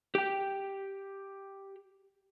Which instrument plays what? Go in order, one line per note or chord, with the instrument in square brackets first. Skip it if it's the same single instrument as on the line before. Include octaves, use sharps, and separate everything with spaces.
[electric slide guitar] G4 G5